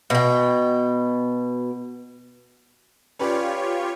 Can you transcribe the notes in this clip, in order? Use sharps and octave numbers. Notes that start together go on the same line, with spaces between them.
B2 G5
C#4 F4 G4 B4 C#5 D5